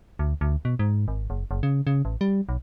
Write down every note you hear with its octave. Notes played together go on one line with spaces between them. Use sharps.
D2
D2
B2
G#2
G#1
F#1
F#1
C#3
C#3
A1
G3
B1